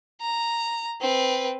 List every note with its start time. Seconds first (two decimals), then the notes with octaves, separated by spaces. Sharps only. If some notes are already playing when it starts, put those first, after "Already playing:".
0.21 A#5
1.01 C4 B4